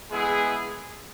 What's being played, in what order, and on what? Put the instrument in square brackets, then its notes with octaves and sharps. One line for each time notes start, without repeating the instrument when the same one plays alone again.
[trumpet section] G#3 B3 E4 G#4